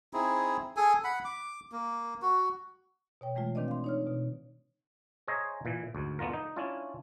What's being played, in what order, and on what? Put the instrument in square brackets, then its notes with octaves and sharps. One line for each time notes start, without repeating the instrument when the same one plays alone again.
[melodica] C4 D#4 E4 G#4
G#4 A4 G#5
F#5 B5
D6
A#3
F#4
[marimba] B2 C#5 G5
E3 G#3 A3 F4
D#3 C4 D4 B4 D5 D#5
F5 C6
D#4 C#5 F6
B2
[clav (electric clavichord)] G#4 C5 C#5 D#5 E5 A#5
A#2 E3
D2 G#2
A3 B3 D4 F4 A#4
D#4
C#4 D4 E4 F4